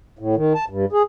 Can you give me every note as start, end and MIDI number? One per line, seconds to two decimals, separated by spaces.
0.19 0.35 45
0.36 0.53 51
0.55 0.65 81
0.69 0.85 43
0.92 1.03 68